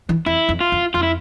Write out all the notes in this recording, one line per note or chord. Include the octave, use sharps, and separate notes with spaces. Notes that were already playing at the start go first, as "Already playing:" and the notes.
E3
F2 E4
F2
F4
F2
F2 F4
E4